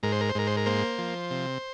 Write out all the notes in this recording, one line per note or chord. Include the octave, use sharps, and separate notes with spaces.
G#2 A#4
C5
A#4
C5
G#2 A#4
C5
A#4
A#3 C5
F3
C3